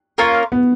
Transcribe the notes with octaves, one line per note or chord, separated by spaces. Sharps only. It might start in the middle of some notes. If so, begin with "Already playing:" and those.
A#3 C#4 F4 A#4
B3